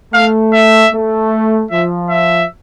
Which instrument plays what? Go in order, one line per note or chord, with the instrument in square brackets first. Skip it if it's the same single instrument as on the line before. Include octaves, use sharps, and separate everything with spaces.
[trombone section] A3 [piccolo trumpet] F5
[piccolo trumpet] E5
[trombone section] A3
[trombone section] F3 [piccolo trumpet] E5
[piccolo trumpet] E5